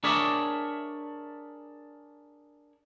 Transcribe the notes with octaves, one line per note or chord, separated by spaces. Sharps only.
D4 G#4 A#4 C#5 D5 E5